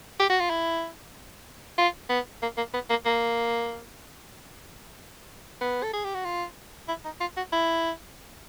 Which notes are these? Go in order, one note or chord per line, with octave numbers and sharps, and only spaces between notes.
G4
F#4
F4
E4
F4
B3
A#3
A#3
B3
A#3
A#3
B3
A4
G#4
G4
F#4
F4
E4
D#4
F4
F#4
E4